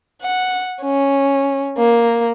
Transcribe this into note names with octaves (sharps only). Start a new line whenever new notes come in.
F#5
C#4
A#3